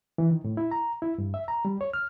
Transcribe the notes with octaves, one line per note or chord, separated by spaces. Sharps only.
E3
D#3
A2
E4
A#5
E4
G2
E5
A#5
G3
C#5
F6